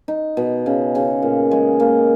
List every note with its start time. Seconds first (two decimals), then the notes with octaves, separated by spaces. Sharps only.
0.08 D#4
0.37 B2
0.66 C#3
0.95 C#3
1.22 A#2
1.51 G#3
1.80 A#3